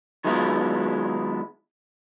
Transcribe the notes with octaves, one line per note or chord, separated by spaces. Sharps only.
D#3 F#3 G#3 B3 E4 F4